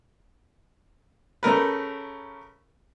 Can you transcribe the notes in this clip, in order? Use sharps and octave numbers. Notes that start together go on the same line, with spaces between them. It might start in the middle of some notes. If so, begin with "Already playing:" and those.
C#3 A3 A#4 B4